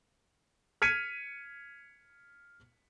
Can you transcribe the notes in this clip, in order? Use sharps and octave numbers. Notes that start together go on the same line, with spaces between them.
F6 G#6 B6 C#7 D#7